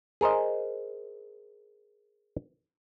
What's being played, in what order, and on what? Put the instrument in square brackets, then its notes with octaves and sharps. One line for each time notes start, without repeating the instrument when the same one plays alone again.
[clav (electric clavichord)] G#4 A#4 C5 D#5